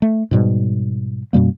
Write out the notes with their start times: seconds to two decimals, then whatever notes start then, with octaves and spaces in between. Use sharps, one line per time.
0.02 A3
0.31 G#2 B2 G3
1.33 F#2 B2 G3 A#3